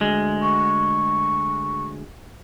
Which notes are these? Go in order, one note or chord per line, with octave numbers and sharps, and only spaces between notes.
D2 G#3
C#6